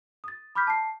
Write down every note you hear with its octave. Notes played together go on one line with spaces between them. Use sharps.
D#6 A6
B5 D6 F6 G6 B6
A5 C7